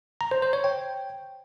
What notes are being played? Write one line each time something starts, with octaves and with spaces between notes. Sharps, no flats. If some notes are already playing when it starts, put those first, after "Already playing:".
A#5
C5
C5
C#5
G5